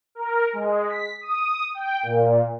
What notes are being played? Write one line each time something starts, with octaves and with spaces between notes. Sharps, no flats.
A#4
G#3
B6
D#6
G5
A#2